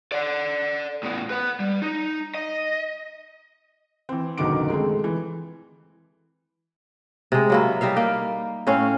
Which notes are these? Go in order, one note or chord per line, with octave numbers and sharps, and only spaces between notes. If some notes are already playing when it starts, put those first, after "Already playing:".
D5 F#5
A2 B3
B4 F#5
G3
D#4
D#5
E3 C4
F#1 B1 D3 D#3 D6 D7
G#3 A3 C4
E3
C3 G#3
F#3 A#3 E4
G3 D#4 E5 F5
A#3 G5
A2 C4 C#4 F5